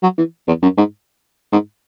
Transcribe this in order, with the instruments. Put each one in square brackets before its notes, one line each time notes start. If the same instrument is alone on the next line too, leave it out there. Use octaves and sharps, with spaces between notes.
[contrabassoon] F#3
E3
E2
F#2
G#2
G#2